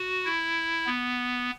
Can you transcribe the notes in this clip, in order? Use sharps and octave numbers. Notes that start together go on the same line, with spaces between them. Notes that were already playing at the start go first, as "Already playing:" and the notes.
Already playing: F#4
E4
B3